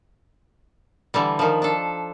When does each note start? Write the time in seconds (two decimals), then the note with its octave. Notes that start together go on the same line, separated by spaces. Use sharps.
1.14 D3 E3 G3
1.39 D#3 F3
1.62 D4 A4